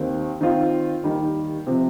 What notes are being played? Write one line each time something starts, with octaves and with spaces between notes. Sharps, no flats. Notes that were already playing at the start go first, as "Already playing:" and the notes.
Already playing: D#2 D#3 C4
D#3 C4 F4
D#2 D#3 G3
C3 F3 C4